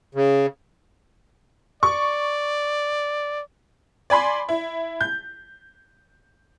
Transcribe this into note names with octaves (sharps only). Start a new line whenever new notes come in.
C#3
D5 C#6
D5 G#5 B5 C6
E4
G6